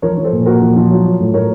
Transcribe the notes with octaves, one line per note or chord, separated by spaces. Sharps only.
F3 A#4 C#5
F3
A4 C5
A#2
A#2 F#4 A#4
F3
F3
F#3
F#3
A2
A2 A#4 C#5